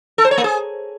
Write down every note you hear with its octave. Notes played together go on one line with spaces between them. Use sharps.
A4
C5
C#5
A#3
G#4